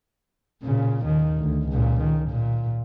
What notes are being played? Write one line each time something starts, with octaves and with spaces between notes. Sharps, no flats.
A#2 C#3
D#2 D#3
D2
C#2 A#2
D#3
A#2